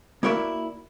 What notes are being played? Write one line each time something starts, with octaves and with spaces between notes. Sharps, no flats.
A#3 E4 F#4 A#4 D5 E5